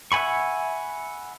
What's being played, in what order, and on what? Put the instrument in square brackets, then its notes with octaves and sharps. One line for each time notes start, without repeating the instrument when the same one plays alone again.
[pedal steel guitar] E5 F#5 G#5 B5 C#6